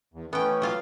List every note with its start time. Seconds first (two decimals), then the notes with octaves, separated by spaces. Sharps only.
0.14 E2
0.33 E3 A3 B3 C#4 G5
0.62 F#3 F4 F5